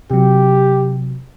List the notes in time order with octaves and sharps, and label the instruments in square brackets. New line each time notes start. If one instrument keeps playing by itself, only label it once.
[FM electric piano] C3 F#3 [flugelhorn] G4